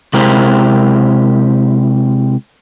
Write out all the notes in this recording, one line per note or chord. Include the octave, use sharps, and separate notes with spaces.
C3 G#3 E4 G4 A#4 C5